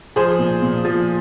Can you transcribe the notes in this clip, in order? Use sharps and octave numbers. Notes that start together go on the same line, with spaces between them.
F3 G#4 C5
A#2
A#2
F3